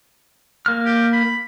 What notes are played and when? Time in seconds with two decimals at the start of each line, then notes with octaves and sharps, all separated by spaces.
0.66 A#3 F6
0.85 G4
1.12 B5